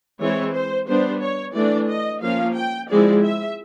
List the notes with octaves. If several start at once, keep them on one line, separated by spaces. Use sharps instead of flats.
E3 G#3 C4 E4 C#5
C5
G3 B3 D4 C5
C#5
E3 A3 D4 D5
D#5
F3 A#3 C#4 F5
G5
F3 G#3 C4 E4 D5
E5